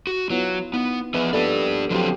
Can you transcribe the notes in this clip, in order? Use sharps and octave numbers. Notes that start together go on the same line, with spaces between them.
F#4
F#3 B3 E4 F4
B3 D#4
F3 B3 G#4 B4 D#5
A#3 B3 D4 G4 A4 D5
D3 F3 F#3 C4 E4 G4